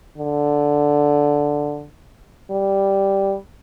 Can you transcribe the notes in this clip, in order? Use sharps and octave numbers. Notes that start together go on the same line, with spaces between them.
D3
G3